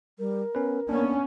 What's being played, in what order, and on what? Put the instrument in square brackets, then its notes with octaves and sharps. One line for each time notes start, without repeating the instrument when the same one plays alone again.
[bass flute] G3 [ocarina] A#4
[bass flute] B3 [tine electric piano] C#4 B4
[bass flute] A#3 [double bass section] B3 C#4 [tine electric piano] D4